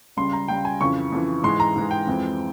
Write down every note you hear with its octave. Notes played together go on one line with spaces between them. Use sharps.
C#2 C#3 G3 C6
A#5
C#2 C#3 G3 G5
G#5
F2 C#3 E3 C#6
F2 C#3 E3
G#2 E3 G#3 C6
A#5
G#2 E3 G#3
G5
F2 E3 G#3 C4